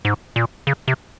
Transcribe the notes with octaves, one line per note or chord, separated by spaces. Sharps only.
G#2
A#2
C#3
C3